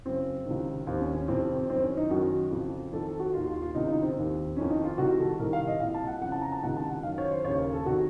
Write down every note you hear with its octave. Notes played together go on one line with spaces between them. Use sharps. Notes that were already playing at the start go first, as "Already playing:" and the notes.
F#2 C#3 C4
C#2 C3 D#3
D#2 D#3 C4
C#4
C#4
F2 C3 D#3 C4
C4
C4
F#2 D#3 C4
C#4
D#4
F#2 D#3 F#4
F2 C#3
F2 D#3 A4
A4
F#4
D#2 D#3 F4
F4
F4
C#2 C3 D#3 D#4
D#4
C4
D#2 D#3
F2 D#3 C#4
D#4
F4
C2 C3 D#3 F#4
A4
C2 C3 D#3 A#4
F5
D#5
C2 A#2 F5
A5
F#5
F2 C#3 F#5
A5
A#5
A5
C#2 C3 D#3 F#5
A5
F#5
F#2 D#3 F5
C#5
C5
D#2 C#3 C#5
A#4
A4
C3 D#3 F#4